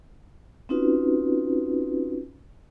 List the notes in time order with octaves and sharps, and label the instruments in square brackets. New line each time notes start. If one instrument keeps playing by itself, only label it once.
[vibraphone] C4 C#4 D#4 F4 F#4 B4